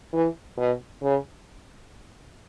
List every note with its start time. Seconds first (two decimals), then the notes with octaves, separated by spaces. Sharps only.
0.13 E3
0.57 B2
1.02 C#3